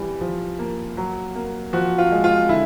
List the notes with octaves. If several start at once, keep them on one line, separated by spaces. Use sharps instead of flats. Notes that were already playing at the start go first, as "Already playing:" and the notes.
Already playing: E3 G3
F3
A#3
F#3
A#3
F3 F#4
F4
G#3
F4
D3 E4